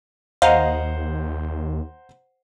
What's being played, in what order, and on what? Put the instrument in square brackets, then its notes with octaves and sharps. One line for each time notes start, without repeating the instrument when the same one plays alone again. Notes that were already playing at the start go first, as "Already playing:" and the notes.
[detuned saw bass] D#2 [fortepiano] C5 F#5 A#5 [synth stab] D#5 F5